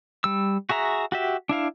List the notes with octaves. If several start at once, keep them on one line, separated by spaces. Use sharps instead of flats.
G3 E6
F#4 G#4 E5 A#5
F#4 G4 E5
D4 E4 F5